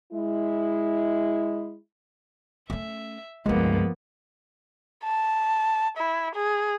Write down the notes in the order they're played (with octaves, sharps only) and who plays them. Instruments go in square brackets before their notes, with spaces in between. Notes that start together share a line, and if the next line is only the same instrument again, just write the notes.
[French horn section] G#3 E4
[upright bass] A3 C#4 [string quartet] E5
[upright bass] C#2 G2 [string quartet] F3 A#3 B3 [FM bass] G#3
[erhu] A5
E4
G#4